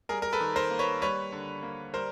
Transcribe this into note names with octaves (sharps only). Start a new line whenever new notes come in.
G3 G#4 A#4
A#4
A4 B4
D#3
A#4 C5
A#3
B4 C#5
G3 B4 C#5
D3
A#3
G3 A#4 C5